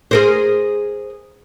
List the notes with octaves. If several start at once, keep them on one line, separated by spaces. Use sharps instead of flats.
G#4 A#4 C5